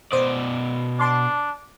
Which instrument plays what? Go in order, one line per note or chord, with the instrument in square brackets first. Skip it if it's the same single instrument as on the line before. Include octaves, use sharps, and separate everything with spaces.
[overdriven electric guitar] B2 D5 [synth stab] C5 D#6
[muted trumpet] D4 [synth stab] A5 C6 D6